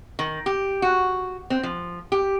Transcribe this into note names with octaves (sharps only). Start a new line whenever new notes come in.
D#3
G4
F#4
C4
F3
G4